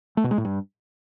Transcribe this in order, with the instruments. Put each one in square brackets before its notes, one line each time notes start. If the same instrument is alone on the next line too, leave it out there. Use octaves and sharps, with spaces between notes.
[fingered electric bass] A3
B2
G#3
A2
G2